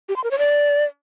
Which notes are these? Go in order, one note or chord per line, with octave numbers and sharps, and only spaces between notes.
G4
C6
A#4
C#5
D5